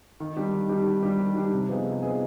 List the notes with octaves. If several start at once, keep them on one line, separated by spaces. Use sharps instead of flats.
D#3
G3 D4 G4
D#3
G3 D4 G4
D#3
G3 D4 G4
D#3
G3 D4 G4
C3
F3 B3 D#4 G#4
C3
F3 B3 D#4 G#4